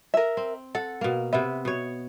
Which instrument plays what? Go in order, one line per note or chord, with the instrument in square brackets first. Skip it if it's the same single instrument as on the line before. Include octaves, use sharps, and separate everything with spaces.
[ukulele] A#4 E5
[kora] C4
[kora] A4 [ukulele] F#5
[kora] B2 A#3
[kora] C3 B3 [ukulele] E5
[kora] B2 C#5